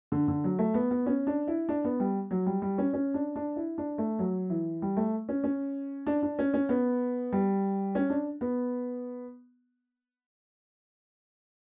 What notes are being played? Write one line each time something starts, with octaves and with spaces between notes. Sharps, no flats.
D3
D3
F#3
A3
B3
B3
C#4
D4
E4
D4
B3
G3
F#3
G3
G3
C#4
C#4
D4
D4
E4
D4
A3
F#3
E3
G3
A3
C#4
C#4
D4
D4
C#4
C#4
B3
G3
C#4
D4
B3